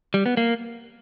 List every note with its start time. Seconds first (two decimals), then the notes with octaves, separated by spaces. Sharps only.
0.14 G3
0.26 B3
0.37 A#3